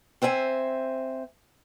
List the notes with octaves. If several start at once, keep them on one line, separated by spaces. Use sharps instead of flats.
C4 C5 E5 G5 G#5